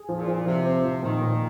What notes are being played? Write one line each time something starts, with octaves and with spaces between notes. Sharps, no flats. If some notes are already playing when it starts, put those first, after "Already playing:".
Already playing: G#4
F3
A#2
F3
C3 F3
C4
F3
A#2 D#3
A#2